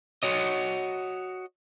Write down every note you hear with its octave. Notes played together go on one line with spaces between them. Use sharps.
F#4 C#5 D#5